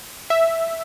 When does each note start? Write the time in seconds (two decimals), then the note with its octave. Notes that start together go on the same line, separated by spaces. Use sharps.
0.30 E5